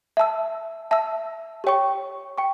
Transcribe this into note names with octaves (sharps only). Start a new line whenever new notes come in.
E5 A5 E6
E5 A5 E6
G4 C#5 G5 C#6
G5 C#6